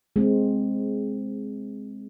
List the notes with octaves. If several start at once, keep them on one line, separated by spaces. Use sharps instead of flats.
G#3 C4